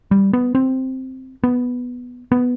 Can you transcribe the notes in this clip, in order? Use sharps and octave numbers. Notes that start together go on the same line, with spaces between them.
G3
B3
C4
B3
B3